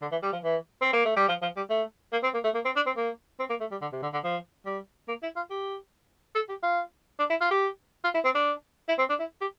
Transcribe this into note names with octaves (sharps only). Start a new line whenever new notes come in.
D3
E3
G3
F3
E3
C4
A#3
A3
G3
F3
F3
G3
A3
A#3
C4
A#3
A3
A#3
C4
D4
C4
A#3
C4
A#3
A3
G3
D3
C3
D3
D3
F3
G3
A#3
E4
F4
G4
A4
G4
F4
D4
E4
F4
G4
F4
E4
C4
D4
E4
C4
D4
E4
G4